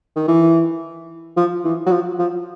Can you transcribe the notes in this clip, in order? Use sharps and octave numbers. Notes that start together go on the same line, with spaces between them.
D#3
E3
F3
E3
F#3
F3
F3